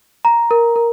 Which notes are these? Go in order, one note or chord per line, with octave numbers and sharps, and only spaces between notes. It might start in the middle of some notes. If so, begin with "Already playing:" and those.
A#5
A#4
A#4